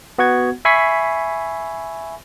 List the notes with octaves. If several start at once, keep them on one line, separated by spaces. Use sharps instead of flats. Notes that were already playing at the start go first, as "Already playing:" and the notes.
B3 F#4 F#5 G#6
E5 G#5 B5 C#6 B6 C7